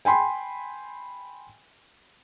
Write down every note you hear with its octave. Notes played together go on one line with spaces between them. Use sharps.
G5 G#5 B5 C6